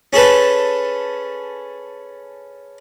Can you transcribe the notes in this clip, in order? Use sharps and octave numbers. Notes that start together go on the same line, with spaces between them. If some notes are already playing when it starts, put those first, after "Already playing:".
C#4 G#4 A4 B4